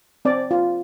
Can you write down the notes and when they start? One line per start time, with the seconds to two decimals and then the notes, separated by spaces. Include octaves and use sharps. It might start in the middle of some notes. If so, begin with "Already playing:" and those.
0.25 C4 D5
0.51 F4